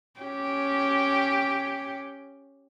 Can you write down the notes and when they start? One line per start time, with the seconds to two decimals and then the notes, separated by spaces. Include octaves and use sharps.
0.20 C#4 G4